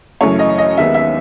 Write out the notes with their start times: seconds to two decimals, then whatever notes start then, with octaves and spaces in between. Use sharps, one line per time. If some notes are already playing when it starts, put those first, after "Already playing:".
0.21 F#2 C#3 E3 A3 C#5
0.39 D#5
0.58 D#5
0.77 D#2 D#3 G#3 B3 E5
0.94 E5